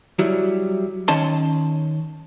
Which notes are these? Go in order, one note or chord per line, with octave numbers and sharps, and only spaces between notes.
F#3 G3 E4
D#3 C#4 C#5 A5 C6